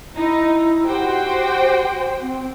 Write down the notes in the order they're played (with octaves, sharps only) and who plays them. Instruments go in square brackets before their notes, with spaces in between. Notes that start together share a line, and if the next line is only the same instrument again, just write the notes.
[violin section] D#4 [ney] E4
[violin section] F#4 C5 G5 [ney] G4
[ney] C4